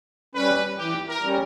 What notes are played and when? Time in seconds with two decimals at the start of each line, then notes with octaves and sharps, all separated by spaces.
0.34 G3 C#4 B4
0.78 E3 G4
1.08 A#4
1.22 G3 C#4